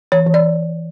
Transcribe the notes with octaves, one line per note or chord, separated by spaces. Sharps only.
E3 C#5
E3
D5